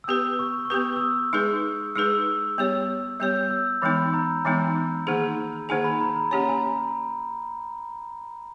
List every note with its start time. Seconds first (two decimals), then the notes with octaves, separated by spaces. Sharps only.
0.04 E6
0.08 B3 G4 B4 D#6
0.39 C#6
0.65 C#6
0.70 B3 G4 B4 D#6
0.96 E6
1.01 D#6
1.33 G#3 D#4 G#4 B4
1.95 G#3 D#4 G#4 B4 E6
2.58 G3 B3 G4 C#5
3.20 G3 B3 G4 C#5 G6
3.51 E6
3.82 E3 G#3 B3 D#4 B5
4.14 A#5
4.45 E3 G#3 B3 D#4 G#5
5.07 D#3 A#3 D#4 G#4
5.69 D#3 A#3 D#4 G#4 G#5
5.84 B5
6.01 A#5
6.16 A#5
6.31 A#3 C#4 G4 C#5 G#5
6.40 A#5
6.49 G#5